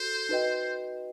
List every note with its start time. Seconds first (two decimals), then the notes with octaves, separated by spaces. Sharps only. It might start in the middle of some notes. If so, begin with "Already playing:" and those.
Already playing: F#4 A4 C5
0.29 D#4 F#4 B4 D#5 G5